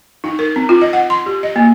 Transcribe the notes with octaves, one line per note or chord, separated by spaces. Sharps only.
D#4
A#4
C4
F4
D#5
F#5
C6
G4
D#5
A#3